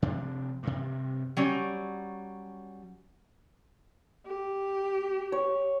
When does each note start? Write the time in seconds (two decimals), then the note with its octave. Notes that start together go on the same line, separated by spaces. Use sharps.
0.02 C3 F3 D4
0.63 G2 C3
1.37 F#3 G3 C#4
4.26 G4
5.32 C#5